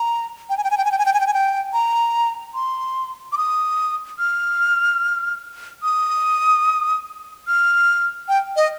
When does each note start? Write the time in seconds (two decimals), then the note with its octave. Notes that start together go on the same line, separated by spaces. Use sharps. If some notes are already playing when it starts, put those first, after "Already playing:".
Already playing: A#5
0.50 G5
0.58 G#5
0.64 G5
0.71 G#5
0.78 G5
0.85 G#5
0.92 G5
0.99 G#5
1.06 G5
1.14 G#5
1.20 G5
1.27 G#5
1.34 G5
1.73 A#5
2.54 C6
3.32 D6
3.38 D#6
4.19 F6
5.83 D#6
7.48 F6
8.28 G5
8.56 D#5